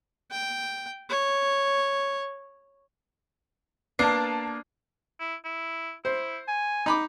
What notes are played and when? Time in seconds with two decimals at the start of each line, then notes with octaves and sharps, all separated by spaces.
0.31 G5
1.10 C#5
3.99 A#3 B3 D4 A5 C7
5.20 E4
5.45 E4
6.05 E4 C5
6.48 G#5
6.86 D#4 B5 D6